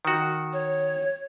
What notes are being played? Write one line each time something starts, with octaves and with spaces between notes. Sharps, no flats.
D#3 F#4
C#5